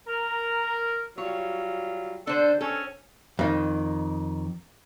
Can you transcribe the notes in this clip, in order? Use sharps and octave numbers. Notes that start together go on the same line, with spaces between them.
A#4
F#3 G3 F4 C#5
D3 D4 A4 C5
C4 C#4 A4
F2 D#3